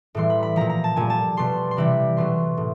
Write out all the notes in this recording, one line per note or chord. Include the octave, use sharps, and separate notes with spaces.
A2 E3 G3 C6
B5
B5
A#2 F3 A#5
A#5
A5
A#2 G3 G#5
A5
B2 G3 C6
C6
C3 E3 G3 B5
B2 F#3 C6
A2